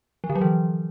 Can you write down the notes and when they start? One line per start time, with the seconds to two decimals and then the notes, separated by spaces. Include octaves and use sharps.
0.24 F3
0.30 D3
0.36 F#3
0.41 E3